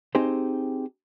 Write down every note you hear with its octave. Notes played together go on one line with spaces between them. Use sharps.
C4 D#4 G4 G#4 C5